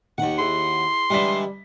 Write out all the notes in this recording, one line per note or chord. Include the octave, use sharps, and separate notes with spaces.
D#2 D#3 F#5
E4 G#4 C6
D3 E3 G3 G#3 B6